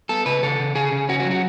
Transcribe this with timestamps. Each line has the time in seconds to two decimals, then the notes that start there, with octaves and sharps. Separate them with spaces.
0.09 B3 A4
0.26 C#3 B4
0.43 C#3 A4
0.60 C#3
0.75 C#3 G#4
0.92 C#3
1.09 C#4 F#4
1.20 F#4
1.25 F#3
1.31 F#4